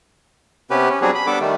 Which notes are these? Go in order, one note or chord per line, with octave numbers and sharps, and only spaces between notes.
C3 B3 C#4 G4 B4
C#4
F#3 G3 B3 C4 D4 G#4
B5
G3 B3 D4 A4 D6
D#3 G3 A3